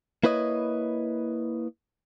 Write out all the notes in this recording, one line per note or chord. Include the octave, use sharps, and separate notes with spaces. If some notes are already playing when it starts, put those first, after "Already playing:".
A#3 E4 B4 C#5 D#5